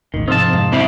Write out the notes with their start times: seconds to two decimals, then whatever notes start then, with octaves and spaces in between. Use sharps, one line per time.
0.14 E1 A1 D#3
0.28 G#2 C3 F3 C4 D#4 F4 A5
0.53 F2 G#2 C3 F5
0.73 C4 E4